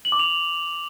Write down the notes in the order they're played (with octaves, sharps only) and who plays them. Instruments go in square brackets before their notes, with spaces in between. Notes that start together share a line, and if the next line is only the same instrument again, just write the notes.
[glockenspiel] F#7
D6
F7